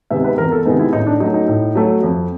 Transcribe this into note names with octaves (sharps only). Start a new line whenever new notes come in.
C3 D#3 G#3 B3 E5
B4
E2 A#4
A4
C3 D#3 G#3 B3 D#4
E4
A2 D#4
D4
F#3 A3 D#4
D#4
A2
F#3 A3
F2